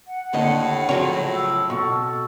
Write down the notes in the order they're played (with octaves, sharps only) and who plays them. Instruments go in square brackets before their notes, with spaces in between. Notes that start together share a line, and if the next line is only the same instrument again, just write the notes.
[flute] F#5
[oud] D#2 D#5 [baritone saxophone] A2 [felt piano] D3 D4
[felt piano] C#3 [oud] F3 F#3 C#5
[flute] E6
[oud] B2 [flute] A4 [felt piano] C#6